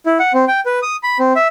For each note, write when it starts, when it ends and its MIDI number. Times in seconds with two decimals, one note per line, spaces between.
0.06 0.18 64
0.20 0.32 78
0.34 0.45 60
0.48 0.60 79
0.66 0.79 71
0.82 0.96 87
1.03 1.18 83
1.19 1.33 60
1.36 1.48 76